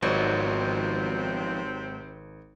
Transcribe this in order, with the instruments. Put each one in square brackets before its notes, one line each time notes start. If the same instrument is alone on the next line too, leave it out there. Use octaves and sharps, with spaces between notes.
[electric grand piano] G#1 [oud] G#2 F#3 [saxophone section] C3 C4 [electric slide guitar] D#3 F3 B3